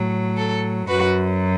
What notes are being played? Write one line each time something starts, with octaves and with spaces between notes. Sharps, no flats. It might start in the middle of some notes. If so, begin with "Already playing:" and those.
Already playing: A2 F#3
A4
F#2 F#3 F#4 B4